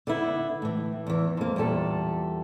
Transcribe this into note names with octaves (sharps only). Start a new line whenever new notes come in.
D3 B3 E4
A2 E3
E2 E3
F2 A#3
E2 A#2 G3 A4